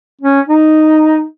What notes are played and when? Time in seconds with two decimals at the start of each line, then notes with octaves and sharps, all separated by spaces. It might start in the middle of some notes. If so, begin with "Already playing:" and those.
0.21 C#4
0.48 D#4